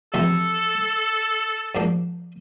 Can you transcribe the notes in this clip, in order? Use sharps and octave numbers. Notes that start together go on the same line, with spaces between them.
E2 C3 F3 A3 C4 A4
G#2 F3 A#3 D4